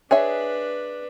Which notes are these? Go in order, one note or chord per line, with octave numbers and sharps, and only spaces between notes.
D4 G#4 B4 C#5 E5